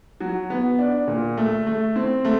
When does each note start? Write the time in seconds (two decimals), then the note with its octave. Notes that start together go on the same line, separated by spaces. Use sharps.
0.21 F#3
0.50 B3
0.79 D4
1.08 A#2
1.37 A3
1.66 A3
1.96 C4
2.25 A3